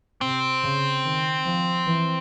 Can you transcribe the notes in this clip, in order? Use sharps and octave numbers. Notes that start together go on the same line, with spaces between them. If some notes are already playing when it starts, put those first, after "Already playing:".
C3 C4
C#3
D#3
F3
E3